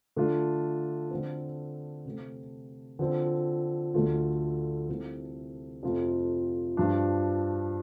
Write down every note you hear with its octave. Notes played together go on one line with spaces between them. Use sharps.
D3 A3 D4 F4
D3 A3 C4
C3 A3 C4
D3 F3 C4
D2 D3 A3 F4
C2 C3 A3
F2 C3 A3 F4
G2 F3 D4 F4